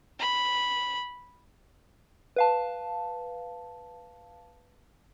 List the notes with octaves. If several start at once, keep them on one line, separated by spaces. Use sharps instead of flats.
B5
B4 F5 A5